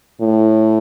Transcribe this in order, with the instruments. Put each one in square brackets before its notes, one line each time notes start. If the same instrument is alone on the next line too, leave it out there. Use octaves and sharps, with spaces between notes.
[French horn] A2